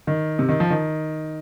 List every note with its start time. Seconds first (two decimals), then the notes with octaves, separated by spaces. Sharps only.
0.07 D#3
0.39 C3
0.49 D#3
0.60 F3
0.70 D#3